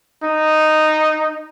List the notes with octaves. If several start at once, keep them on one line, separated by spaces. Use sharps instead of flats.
D#4